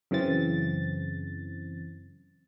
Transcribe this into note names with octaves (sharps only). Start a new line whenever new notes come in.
F#2 C#3 E3 C4 A6